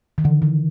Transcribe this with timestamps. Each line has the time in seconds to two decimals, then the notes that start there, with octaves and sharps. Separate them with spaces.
0.18 D#3
0.24 D3 E3
0.42 E3